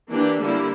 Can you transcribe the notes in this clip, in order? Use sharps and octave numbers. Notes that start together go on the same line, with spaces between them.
E3 A#3 D4 G4
D3 G3 A#3 E4